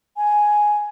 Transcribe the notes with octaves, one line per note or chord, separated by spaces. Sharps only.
G#5